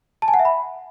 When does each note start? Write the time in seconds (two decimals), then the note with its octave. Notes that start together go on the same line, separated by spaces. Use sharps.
0.22 A5
0.28 G#5
0.34 F#5
0.39 E5
0.45 B5